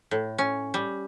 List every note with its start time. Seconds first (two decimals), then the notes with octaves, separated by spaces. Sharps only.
0.11 A2
0.38 C#4
0.74 G3